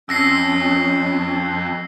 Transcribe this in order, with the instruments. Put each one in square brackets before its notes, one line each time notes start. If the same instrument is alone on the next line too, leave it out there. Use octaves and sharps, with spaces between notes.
[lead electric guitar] F2 [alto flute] C#4 [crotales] E6 A#6 C7